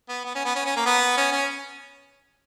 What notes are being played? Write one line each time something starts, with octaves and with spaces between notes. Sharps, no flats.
B3
B3
C#4
B3
C#4
C#4
A#3
B3
C#4
C#4